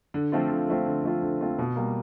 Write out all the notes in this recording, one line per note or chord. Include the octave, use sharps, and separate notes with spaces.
D3
F3 A3 C4 F4
D3
F3 A3 C4 F4
D3
F3 A3 C4 F4
D3
F3 A3 C4 F4
B2
G3 A#3